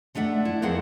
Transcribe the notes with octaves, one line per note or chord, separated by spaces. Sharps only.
G#3 A3 D4 E5 F#5
E4
F2 A#3 C4 G#4 B4 F#5